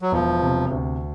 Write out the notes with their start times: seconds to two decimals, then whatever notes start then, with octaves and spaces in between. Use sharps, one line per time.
0.02 F#3
0.12 E1 F3
0.42 C3
0.71 D2